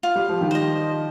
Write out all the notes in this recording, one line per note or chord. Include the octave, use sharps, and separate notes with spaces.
F4
G3
F3
D#3 G3
C5 D#5